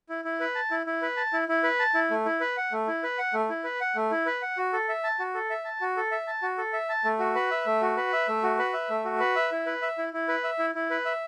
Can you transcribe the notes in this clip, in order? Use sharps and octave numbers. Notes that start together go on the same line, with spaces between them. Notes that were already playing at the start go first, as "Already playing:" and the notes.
E4
E4
B4
A5
E4
E4
B4
A5
E4
E4
B4
A5
E4
A3
E4
B4
F#5
A3
E4
B4
F#5
A3
E4
B4
F#5
A3
E4
B4
F#5
F#4
A4
E5
A5
F#4
A4
E5
A5
F#4
A4
E5
A5
F#4
A4
E5
A5
A3
F#4
B4
E5
A3
F#4
B4
E5
A3
F#4
B4
E5
A3
F#4
B4
E5
E4
B4
E5
E4
E4
B4
E5
E4
E4
B4
E5